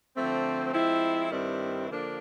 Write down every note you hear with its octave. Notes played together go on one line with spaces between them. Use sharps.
D3 F3 A3 C4
F3 G#3 C4 E4
G2 D#3 G3 C4 E4
D3 F3 A#3 D4